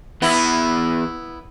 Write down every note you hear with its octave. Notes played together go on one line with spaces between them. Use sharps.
E2 E3 B3 E4